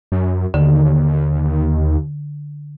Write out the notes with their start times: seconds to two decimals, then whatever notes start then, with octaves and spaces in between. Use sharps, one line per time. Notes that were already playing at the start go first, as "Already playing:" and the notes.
0.12 F#2
0.54 D#2 D3